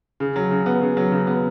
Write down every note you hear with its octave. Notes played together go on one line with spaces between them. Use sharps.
C#3
F#3
C#3
B3
C#3
F#3
C#3
B3